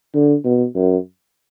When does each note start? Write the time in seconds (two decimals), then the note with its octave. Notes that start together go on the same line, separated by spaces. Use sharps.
0.15 D3
0.45 B2
0.75 F#2